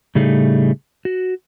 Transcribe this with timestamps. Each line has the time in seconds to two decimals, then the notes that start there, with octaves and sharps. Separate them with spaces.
0.15 A2 C#3 G3 A3 D#4 G#4
1.05 F#4